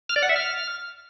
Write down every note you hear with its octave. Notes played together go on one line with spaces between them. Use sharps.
F6
D5
F#5
E5
F6